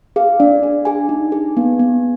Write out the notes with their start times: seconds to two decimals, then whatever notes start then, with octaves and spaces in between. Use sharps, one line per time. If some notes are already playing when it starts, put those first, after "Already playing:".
0.16 G#4 F5
0.40 D4 D5
0.63 D4
0.85 G#4 G#5
1.09 D#4
1.32 G#4
1.57 B3
1.79 B3